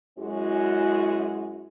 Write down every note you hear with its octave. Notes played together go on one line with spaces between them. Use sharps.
F#2 G#3 C#4 E4 F#4